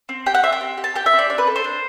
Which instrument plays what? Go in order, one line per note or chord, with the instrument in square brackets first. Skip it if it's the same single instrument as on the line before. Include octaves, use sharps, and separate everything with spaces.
[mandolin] C4
G4 G5
F#5
C4 E5
G5
C4
G4
A5
G4 G5
E5
C4
D5
D4 D5
B4
A4
C5
D4